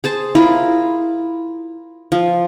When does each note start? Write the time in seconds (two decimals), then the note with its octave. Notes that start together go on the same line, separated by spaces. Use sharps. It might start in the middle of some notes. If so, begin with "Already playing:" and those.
0.04 G#4 C5 A5
0.35 E4 F4 G#4 A#4
2.12 F3